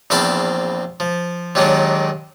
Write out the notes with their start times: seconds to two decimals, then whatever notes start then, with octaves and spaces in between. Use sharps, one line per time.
0.10 A#1 E2 C4 F5 A5 B5
1.00 F3
1.55 D#2 A#2 D#3 F#3 G#3 D4